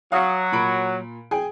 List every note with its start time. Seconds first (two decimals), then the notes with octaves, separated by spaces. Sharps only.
0.12 F#3 F5 F#5 D#6
0.52 A#2 B5 D7
1.31 G#4 G5 G#5